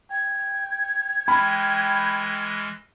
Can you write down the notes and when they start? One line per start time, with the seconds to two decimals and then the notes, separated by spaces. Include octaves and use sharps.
0.11 G5 G#6
1.28 E3 G#3 G5 B5 F6